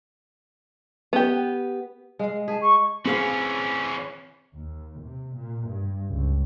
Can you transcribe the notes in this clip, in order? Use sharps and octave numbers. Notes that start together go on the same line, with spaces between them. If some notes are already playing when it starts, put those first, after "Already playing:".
B3 G4
G#3 F5
G#4 A5
C#6
E3 C4 C#4 G#4 F5
D#2
C3
A#2
G2
C#2